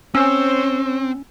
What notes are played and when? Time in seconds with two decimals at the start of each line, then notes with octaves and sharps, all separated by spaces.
0.15 C4 C#4 C5 C#5 E6